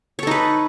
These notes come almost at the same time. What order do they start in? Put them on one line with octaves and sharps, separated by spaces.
C#5 A4 D#4 B4